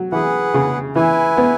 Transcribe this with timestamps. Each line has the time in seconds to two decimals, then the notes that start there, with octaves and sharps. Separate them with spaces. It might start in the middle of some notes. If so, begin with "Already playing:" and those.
Already playing: F#3
0.12 E3 G#4 B4 F#5
0.54 C#3
0.95 E3 E4 B4 G#5
1.37 B3